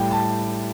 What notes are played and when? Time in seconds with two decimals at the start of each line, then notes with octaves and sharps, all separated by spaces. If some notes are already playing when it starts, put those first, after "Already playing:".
Already playing: A2 G3 G5
0.11 A5